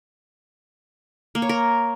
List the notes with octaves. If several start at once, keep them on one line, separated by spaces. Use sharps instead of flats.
A#3
C#5
A#4